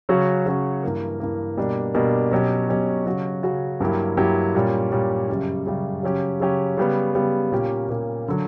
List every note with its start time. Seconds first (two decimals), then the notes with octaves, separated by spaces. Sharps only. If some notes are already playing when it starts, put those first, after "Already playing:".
0.09 C#3 F#3 C#4 F#4
0.46 C#3 F#3 C#4 F#4
0.83 G2 E3 A#3
1.20 G2 E3 A#3
1.57 B2 G3 A#3 D4
1.94 B2 G3 A#3 D4
2.31 B2 F#3 C#4 G4
2.69 B2 F#3 C#4 G4
3.06 C#3 F#3 C#4 F#4
3.43 C#3 F#3 C#4 F#4
3.80 G2 F#3 A#3 E4 G4
4.17 G2 F#3 A#3 E4 G4
4.55 A#2 G3 C#4
4.92 A#2 G3 C#4
5.29 F#2 C#3 G3
5.66 F#2 C#3 G3
6.03 C#3 F#3 C#4 G4
6.40 C#3 F#3 C#4 G4
6.77 C#3 G3 B3
7.15 C#3 G3 B3
7.52 A#2 A#3 C#4 G4
7.89 A#2 A#3 C#4 G4
8.28 D3 F#3